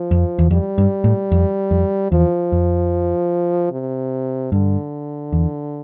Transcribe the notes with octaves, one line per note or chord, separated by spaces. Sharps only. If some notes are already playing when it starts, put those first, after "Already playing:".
Already playing: F3
F2
E2
F2 G3
G2
A2
F2
F2
E2 F3
F2
C3
G2 D3
E2